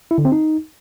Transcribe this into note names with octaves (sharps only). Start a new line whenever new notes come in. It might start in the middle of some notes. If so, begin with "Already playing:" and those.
E4
D3
C4
D#4